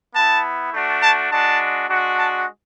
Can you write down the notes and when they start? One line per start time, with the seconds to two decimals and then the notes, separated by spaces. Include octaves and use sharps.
0.14 B3 E4 A5
0.72 A3 D4 F#4
1.02 A5
1.31 G#3 D4 F#4 A5
1.88 G#3 D4 F#4
2.18 A5